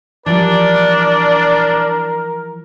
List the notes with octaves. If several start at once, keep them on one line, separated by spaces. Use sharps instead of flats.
E3 F3 G3 D4 A#4 D5